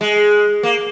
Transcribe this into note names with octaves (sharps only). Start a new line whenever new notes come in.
G#3
A#3